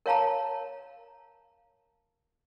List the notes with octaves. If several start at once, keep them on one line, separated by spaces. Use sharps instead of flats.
A#4 C#5 F5 A5 A#5